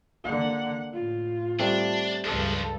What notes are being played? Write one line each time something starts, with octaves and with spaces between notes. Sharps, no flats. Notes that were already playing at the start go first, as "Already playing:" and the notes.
D3 A#3 F#5
A2 F4
G3 A3 C4 D4
C#2 G2 F3 D4 A4